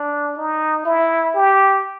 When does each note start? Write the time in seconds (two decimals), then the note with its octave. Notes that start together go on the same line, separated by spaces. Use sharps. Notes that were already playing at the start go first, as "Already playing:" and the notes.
Already playing: D4
0.37 D#4
0.85 E4
1.35 G4